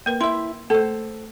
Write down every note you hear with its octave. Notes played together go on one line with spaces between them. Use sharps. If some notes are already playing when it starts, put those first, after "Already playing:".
A#3 A#4 B4
E4 E5 C6
A3 A4 C5